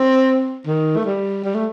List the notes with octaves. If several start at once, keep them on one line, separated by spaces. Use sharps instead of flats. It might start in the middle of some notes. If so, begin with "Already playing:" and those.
Already playing: C4
D#3
A3
G3
G3
A3